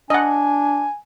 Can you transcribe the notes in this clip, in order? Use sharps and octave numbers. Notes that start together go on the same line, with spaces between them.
D4 D#5 F#5 G#5